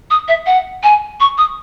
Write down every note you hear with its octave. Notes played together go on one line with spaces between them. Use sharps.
D#6
E5
F#5
G#5
C#6
D#6